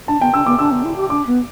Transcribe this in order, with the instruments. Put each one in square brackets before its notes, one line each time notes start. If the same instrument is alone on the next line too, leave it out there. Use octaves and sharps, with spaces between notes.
[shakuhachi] D4 [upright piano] A5
[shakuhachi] B3 [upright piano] G5
[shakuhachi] D4 [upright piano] E6
[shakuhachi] B3 [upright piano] D6
[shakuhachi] D4 [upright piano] E6
[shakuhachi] B3
E4
G4
[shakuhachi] D4 [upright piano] D6
[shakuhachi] B3